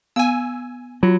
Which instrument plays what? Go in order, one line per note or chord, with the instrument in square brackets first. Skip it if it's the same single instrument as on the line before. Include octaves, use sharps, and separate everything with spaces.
[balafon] B3 F5 [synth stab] G#5 E6
[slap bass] F#3 [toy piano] F4 F#4